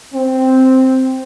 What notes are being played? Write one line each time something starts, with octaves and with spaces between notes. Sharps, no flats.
C4